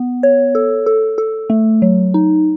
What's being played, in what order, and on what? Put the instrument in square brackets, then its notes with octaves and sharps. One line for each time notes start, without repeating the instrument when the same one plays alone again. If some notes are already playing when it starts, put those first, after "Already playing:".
Already playing: [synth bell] B3
C#5
A4
A4
A4
A3
F#3
D#4